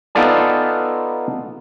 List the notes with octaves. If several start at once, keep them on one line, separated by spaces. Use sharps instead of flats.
B3 D#4 F4 A4 D5 G#5